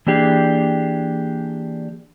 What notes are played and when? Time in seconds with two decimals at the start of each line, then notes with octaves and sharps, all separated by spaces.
0.07 E3 A#3 D4 G4 G#4